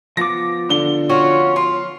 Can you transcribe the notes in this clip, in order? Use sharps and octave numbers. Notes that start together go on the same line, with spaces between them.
F3 B3 D6 A#6
D3 G7
C#4 F4 F#4
F4 C6